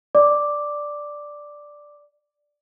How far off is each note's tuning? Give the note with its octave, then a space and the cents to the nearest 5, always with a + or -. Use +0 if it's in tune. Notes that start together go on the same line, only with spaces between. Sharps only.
D5 +0 D6 +0